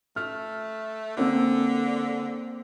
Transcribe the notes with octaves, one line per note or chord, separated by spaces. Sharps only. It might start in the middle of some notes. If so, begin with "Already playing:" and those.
A3 F6
D3 A#3 C4